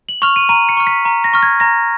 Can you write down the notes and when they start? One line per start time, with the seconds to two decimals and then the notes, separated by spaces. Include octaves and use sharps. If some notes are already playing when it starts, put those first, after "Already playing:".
0.09 F#7
0.22 C#6 F6 F7
0.36 D#7
0.49 A#5 D#7
0.69 C#7
0.77 C#6 F6
0.87 B6
1.05 A#5
1.24 A#6
1.34 C#6 F6
1.43 G#6
1.60 A#5 A#6